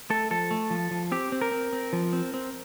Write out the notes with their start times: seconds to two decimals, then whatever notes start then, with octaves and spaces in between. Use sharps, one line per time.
0.10 A3 A4
0.31 F3 A4
0.51 A3
0.70 F3
0.91 F3
1.12 C4 G4
1.32 C4
1.42 A#4
1.52 C4
1.73 C4
1.93 F3
2.13 C4
2.34 C4